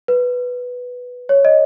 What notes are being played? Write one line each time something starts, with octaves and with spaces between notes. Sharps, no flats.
B4
C#5
D#5